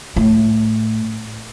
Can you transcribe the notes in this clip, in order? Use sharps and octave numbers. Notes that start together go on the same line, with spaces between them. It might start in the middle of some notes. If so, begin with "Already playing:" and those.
A2